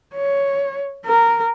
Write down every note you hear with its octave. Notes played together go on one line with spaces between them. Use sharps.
C#5
A#4